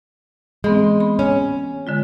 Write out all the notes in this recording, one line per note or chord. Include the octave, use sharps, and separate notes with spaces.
E3 G#3 B3 C4
B5
C#4
D3 G#3 F4